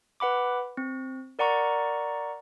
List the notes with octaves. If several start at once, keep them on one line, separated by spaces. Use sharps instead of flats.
B4 F#5 B5 D6
C4
A#4 D5 F#5 A#5 C#6